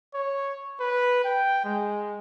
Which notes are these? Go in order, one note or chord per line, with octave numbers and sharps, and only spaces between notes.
C#5
B4
G5
G#3